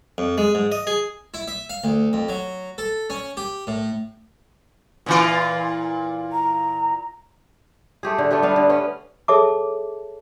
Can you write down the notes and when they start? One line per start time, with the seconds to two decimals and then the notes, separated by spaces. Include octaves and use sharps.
0.18 F2
0.38 G#3
0.55 G#2
0.72 D#5
0.87 G#4
1.34 E4
1.48 E5
1.69 F5
1.84 D2
2.13 F2
2.29 F#3
2.78 A4
3.10 C#4
3.37 G4
3.67 A2
5.06 A#2 E3 F4
6.32 A#5
8.03 A3 G4 G#4
8.18 D3
8.31 A3 B3 D4 G4
8.42 G3 A3 B3 F5
8.56 D3
8.69 B3 C#4
9.28 G#4 A4 C#5 E5 A5 D6